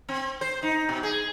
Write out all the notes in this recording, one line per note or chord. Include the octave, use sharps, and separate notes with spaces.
C4
C5
D#4
B2
G#4